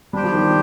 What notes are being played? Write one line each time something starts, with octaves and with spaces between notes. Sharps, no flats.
G3 D4 G4 C5 G5
F3
D#3
F3